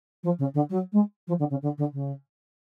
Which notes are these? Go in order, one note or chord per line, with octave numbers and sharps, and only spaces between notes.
F3
C#3
D3
F#3
G#3
F3
D3
C#3
D3
D3
C#3